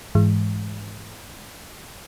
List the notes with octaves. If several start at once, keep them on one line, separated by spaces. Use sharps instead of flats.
G#2 E3 G#3